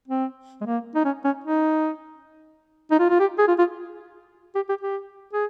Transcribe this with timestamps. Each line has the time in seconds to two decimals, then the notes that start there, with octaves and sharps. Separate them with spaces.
0.08 C4
0.61 G#3
0.66 A#3
0.95 D#4
1.05 C#4
1.24 C#4
1.44 D#4
2.91 D#4
2.99 F4
3.10 F4
3.20 G4
3.38 G#4
3.48 F4
3.58 F4
4.55 G4
4.69 G4
4.81 G4
5.33 G#4